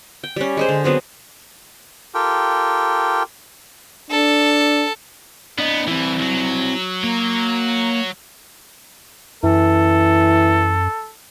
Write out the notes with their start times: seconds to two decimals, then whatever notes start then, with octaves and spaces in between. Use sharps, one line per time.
0.24 G5
0.36 G3 C#4
0.57 G#3 G#4 C5
0.69 D3
0.84 F#3 B3 C4 G#4
2.14 F4 G4 A4 A#4 G5
4.11 D4 A4
5.59 B3 D4 D#5
5.88 E3 C4 E4
6.22 F#3
7.04 A#3
9.43 F#2 E3 A4